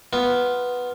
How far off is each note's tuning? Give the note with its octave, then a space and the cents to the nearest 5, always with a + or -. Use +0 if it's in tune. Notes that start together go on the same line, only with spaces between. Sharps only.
B3 +0 F4 +0